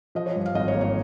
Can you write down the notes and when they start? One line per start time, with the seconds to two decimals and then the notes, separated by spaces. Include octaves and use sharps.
0.15 F3 D#5
0.26 C#5
0.36 G2
0.46 F5
0.55 G#1 D#5
0.68 C#5
0.75 A#3
0.81 C#5